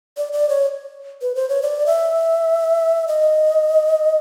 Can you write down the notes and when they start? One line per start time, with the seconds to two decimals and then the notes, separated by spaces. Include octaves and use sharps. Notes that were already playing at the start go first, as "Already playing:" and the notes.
0.17 D5
0.33 D5
0.49 C#5
1.22 B4
1.35 C5
1.49 C#5
1.62 D5
1.86 E5
3.08 D#5